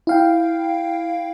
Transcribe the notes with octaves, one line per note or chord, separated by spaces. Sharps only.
E4 F5 G5